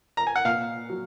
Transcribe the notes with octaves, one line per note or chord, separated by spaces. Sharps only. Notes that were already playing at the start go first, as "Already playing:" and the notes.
A#5
G#5
F#5
A#2 F5
F#3